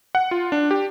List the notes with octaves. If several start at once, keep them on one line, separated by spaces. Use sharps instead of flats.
F#5
F4
D4
G4